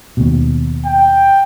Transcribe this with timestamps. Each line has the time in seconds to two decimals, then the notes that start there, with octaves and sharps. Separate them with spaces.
0.17 D#2 B2
0.86 G5